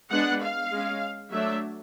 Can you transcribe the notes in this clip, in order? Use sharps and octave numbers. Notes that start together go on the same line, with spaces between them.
G#3 B3 D4 F#5
F5
G#3 C#4
F#3 A3 D4 E5